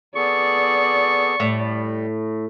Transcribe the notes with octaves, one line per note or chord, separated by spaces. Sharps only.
B3 G#4 A4 D5 C#6
A2 G3